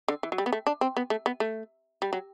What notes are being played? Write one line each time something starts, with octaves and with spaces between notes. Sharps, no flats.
D3
E3
F#3
G3
B3
A3
D4
C4
B3
A3
B3
A3
G3
F#3